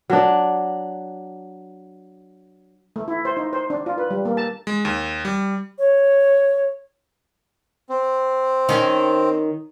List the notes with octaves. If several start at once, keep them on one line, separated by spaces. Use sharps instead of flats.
F#3 D4
A3
E4
C5
D#4
C5
D4
F4
B4
G3
A#3
A5
G#3
D#2
G3
C#5
C4
D#3 C#4